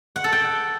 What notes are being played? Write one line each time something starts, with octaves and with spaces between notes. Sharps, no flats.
F#5
A4
G5